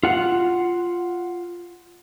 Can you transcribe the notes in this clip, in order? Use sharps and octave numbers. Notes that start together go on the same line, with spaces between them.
F4 F#5